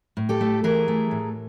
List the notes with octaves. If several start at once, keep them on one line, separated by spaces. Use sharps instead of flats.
A2
G4 A4
A3
E3 G#4 A#4
A3
A2